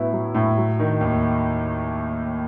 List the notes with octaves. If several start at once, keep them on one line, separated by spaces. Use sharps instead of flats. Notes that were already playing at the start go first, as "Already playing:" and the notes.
Already playing: A2 F#3 B3 E4
F#3
A2
F#3
D#3
D#2